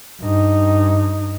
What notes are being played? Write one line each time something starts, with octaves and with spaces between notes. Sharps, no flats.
G2 D#4